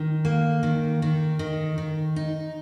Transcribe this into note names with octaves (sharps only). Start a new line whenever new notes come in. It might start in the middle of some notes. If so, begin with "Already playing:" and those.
Already playing: D#3
A#3
D#3
D#3
D#3
D#3
D#4